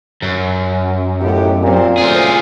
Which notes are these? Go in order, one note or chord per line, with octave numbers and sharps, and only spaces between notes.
F#2
D#2 A2 B3 G4
A#2 C4
F#2 A2 F4 G#4 C5